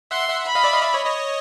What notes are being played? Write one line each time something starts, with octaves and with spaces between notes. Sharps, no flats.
E5 F#5 C6
E5 F#5
B5
D#5 F5
D5 E5
D#5 F5
D5 E5
C#5 D#5
C#5 D#5